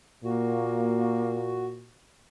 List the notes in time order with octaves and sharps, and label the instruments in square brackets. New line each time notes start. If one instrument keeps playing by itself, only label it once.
[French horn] A#2 [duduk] A#3 [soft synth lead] F#4